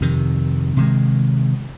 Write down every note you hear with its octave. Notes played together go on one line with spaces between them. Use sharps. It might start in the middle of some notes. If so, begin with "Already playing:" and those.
F2 C3 D#3
C3 D#3 G#3